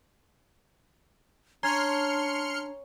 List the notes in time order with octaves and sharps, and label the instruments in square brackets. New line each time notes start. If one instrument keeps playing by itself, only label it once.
[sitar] C#4 [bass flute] D4 [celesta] A#5 G#6 [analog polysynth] C6 F6 C#7